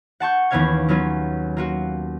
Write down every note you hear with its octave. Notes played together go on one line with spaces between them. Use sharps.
F#5 A5 C#6 G6
D#2 E3 B3 C#4 F5 G#6
F#3 B3 C#4 F4 G#4
A#3 F4 F#4